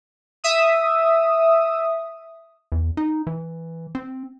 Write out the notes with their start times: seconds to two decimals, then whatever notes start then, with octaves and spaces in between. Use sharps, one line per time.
0.44 E5 D#6
2.72 E2
2.97 D#4
3.27 E3
3.95 C4